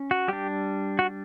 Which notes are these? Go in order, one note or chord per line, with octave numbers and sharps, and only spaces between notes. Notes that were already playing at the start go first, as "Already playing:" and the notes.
Already playing: C#4
F#4
G3 D4 G4
F#4